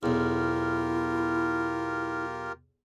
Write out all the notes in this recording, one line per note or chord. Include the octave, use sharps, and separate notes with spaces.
B1 E2 E4 F4 G4 A#4